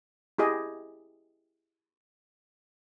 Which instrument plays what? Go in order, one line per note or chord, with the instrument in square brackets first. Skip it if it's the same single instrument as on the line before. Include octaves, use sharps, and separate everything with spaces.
[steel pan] E4 G4 G#4 D#5